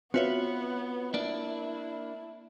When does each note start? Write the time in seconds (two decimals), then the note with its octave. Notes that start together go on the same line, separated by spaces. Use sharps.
0.14 B3 C4 F4 F#4 B4 C#5 E5
1.14 A#3 D4 E4 D5